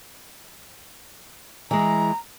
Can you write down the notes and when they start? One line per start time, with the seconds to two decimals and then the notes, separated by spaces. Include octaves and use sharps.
1.71 E3 G#3 A#5